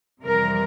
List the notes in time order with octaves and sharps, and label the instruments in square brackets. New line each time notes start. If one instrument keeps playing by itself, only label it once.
[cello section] F2 C3 E3 G3 A#4